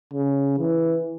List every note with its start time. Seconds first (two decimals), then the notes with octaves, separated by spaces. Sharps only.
0.13 C#3
0.59 E3